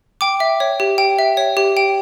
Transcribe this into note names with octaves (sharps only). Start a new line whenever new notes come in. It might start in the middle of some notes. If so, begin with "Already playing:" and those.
G5 D6
E5
C#5
G4
G5
E5
C#5
G4
G5